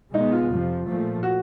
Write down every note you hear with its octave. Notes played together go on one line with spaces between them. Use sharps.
B2 G#3 B3 D#4
F4
F2 C3 F3
A#2 F3 A3
F#4